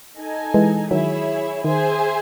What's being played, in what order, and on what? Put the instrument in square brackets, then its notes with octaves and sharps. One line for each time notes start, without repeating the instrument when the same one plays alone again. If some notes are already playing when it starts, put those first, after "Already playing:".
[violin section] D#4 A4 D#5 G#5
[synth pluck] E3 G#3
[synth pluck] D#3 F#3 [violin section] E4 G#4 C#5 E5
[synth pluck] D#3 [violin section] G#4 C5 E5 G#5